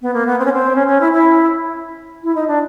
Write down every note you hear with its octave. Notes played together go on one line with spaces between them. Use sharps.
B3
A#3
B3
C4
C#4
C4
C#4
C#4
E4
E4
E4
D#4
D4